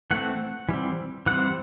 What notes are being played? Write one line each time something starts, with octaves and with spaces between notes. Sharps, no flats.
E3 A3 C4 F#5
E3 G3 C4
E3 G3 C4 F#5